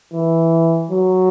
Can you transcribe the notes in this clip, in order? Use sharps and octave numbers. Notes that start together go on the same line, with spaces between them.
E3
F#3